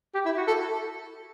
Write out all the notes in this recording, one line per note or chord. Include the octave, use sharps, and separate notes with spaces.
G4
E4
F#4
A4